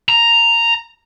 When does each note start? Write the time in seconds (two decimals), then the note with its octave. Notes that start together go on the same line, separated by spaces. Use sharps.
0.09 A#5